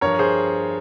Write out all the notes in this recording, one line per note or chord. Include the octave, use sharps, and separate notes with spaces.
G2 F3 A#4 C#5
G#4 C5